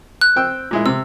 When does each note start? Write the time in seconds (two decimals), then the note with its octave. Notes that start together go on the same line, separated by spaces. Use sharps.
0.21 F#6
0.36 C4 G5 E6
0.71 A#2 G#3 E4
0.86 C3 E6